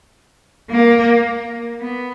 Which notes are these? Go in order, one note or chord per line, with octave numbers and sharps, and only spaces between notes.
A#3
B3